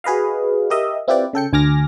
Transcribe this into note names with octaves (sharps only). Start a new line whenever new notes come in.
F#4 G#4 B4 D#5 F5
G4 A#4 D#5 E5
C4 E4 F4 G4 B4 D5
C#3 A4 G5 C#7
D2 G#5 D6 F6 A#6